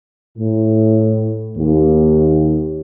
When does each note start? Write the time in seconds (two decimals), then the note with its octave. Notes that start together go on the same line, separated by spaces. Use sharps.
0.38 A2
1.57 D#2